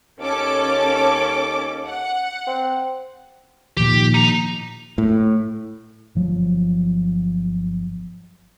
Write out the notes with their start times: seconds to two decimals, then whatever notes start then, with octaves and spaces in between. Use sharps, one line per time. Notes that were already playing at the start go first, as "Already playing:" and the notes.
0.19 D#2 C#4 A4 D6
1.87 F#5
2.47 C4
3.77 A#2 D#3 F3 G4
4.14 D#4 A#5
4.98 A2
6.15 G1 F3 F#3